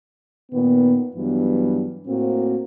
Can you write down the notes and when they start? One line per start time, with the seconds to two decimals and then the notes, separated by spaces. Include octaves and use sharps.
0.52 A#2 D#3 B3
1.15 G2 E3 F#3 B3
2.08 A2 A#3 C4 F#4